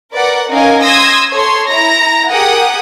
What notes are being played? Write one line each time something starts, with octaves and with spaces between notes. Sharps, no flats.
A#4 B4 D5 F#5
C#4 D#4 A#4 D#5 F5 G#5
C6 D#6 E6 G#6 A#6
A4 C#5 C6
E4 A#5 A#6
G4 G#4 A#4 F#5 G5 D#6